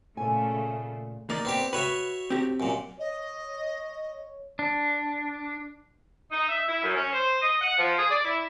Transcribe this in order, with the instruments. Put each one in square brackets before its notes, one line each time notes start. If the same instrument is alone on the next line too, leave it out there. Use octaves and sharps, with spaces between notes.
[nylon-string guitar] A#2 G#5 [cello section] C#3 A3
[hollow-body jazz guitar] A#3 D5 [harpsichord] D#4
[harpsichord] B3 C4 G4
[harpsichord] F#4 C#5 E5 [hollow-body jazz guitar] B4
[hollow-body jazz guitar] C4 G4
[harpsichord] F#2 A#2
[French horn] C#5 [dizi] D#5
[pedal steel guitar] D4
[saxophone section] D#4
E5
E4
F#2
C#4
C5
D#5
F#5
F3
G#4
D5
E4